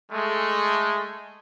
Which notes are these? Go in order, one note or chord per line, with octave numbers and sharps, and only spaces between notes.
G#3 A3